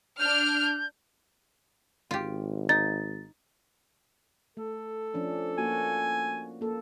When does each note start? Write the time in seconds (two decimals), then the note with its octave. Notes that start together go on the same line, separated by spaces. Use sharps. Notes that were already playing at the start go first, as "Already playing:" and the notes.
0.20 D4 F6 G6
2.11 G#1 F4 G4
2.69 D#4 A6
4.57 A3 A4
5.14 F3 C#4 D4
5.58 A#3 F#4 G#5
6.61 A#3 A4